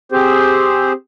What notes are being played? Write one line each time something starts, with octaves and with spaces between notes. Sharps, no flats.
C4 G4 G#4 C5